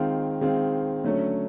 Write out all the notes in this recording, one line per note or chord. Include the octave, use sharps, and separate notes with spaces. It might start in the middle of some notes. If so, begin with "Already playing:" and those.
Already playing: D#3 G#3 C4 F4
D#3 G#3 C4 F4
D3 F#3 A3 C#4